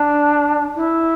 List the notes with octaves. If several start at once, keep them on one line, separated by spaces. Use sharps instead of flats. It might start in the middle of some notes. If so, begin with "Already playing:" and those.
Already playing: D4
E4